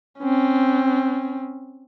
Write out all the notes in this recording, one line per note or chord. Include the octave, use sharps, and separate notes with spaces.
C4 C#4